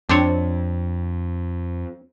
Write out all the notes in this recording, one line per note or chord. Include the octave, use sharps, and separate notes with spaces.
F2 C4 D4 C5 C#5